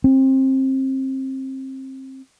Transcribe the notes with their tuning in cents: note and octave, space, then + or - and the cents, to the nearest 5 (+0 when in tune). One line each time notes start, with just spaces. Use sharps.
C4 +25